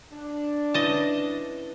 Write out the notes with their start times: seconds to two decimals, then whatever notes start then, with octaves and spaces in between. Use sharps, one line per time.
0.11 D4
0.74 C#4 E4 B4 D#5 A5